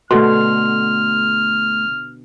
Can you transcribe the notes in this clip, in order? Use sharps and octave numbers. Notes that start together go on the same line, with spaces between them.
B2 D3 A3 C6 F6